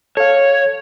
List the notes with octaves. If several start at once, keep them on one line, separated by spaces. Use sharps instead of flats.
A4 C#5 F5